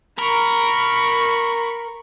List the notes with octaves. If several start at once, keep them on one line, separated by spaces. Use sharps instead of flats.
A#4 B5 C#6